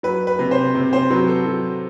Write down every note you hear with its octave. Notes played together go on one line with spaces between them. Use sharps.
F#3 B4
B4
C3
C5
C3
C5
F#3 B4
A4
F#3